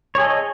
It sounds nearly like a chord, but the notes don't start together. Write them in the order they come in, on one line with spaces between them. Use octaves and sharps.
C#5 G#4 A4 D#5